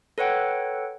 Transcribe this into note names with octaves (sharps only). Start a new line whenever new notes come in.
A4 B4 C#5 F#5 G5